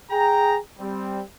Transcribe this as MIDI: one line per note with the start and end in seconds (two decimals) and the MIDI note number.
0.11 0.57 68
0.11 0.57 79
0.11 0.57 82
0.79 1.21 55
0.79 1.21 60